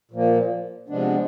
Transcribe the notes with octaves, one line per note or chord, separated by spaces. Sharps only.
A#2 F3 A#3
C3 F3 G#3 B3 D4